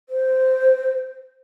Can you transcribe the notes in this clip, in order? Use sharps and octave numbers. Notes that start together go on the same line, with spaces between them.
C5